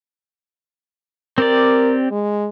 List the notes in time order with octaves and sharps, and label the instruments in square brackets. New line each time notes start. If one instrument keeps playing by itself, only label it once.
[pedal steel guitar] C4 G4 D5 [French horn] A#4
[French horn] G#3